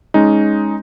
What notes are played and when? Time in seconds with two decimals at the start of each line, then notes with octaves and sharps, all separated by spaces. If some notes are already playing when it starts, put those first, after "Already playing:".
0.14 G#3 C#4 D#4